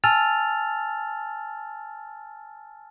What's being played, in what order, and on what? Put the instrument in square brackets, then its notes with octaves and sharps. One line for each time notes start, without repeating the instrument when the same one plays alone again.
[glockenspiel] G#5 A5 E6 F6 A6 F7